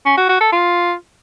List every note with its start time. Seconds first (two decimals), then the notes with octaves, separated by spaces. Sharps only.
0.06 C#4
0.17 F#4
0.29 F#4
0.41 A4
0.52 F4